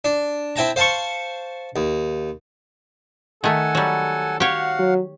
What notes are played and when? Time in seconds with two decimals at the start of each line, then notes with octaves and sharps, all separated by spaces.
0.05 D4
0.56 C4 E4 G5 A5 A#5
0.76 C5 F5 A5 C6 C#6
1.76 D#2
3.44 D#3 A3 A4 F#5 G#5
3.75 F#3 G3
4.40 F#4 G4 C#5 F5 F#5
4.79 F#3